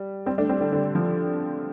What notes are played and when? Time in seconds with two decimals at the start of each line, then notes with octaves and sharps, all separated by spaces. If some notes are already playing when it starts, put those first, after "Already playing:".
Already playing: G3
0.26 G3 C4
0.38 A3 D4
0.49 G3 C4
0.61 D3 G3
0.72 D3 G3
0.95 F3